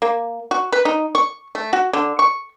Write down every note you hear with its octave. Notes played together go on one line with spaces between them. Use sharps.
A#3
F#4
B4
D#4
C#6
A3
F#4
D3
C#6